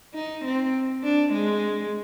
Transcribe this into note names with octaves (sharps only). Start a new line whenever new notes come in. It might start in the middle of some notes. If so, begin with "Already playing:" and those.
D#4
C4
D4
G#3